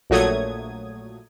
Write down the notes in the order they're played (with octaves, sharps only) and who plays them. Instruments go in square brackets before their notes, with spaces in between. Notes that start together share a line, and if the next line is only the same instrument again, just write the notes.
[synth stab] A#1 A#2 F#3 A3 D#6 G#6